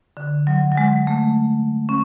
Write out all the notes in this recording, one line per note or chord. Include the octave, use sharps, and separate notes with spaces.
D3
F#3
F#3
G#3
A3
C#4